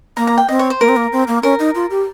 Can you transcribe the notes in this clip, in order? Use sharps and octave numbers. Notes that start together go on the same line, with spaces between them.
A#3 A#5
A#5
G5
C4 D#5
C#5
C5
A#3 A#4
C4
A#3
C4
A#3
C#4 A#4
D#4
F4
G4